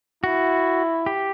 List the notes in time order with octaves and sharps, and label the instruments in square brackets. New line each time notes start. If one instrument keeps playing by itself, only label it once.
[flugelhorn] E4 [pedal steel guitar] F#4
[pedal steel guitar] G4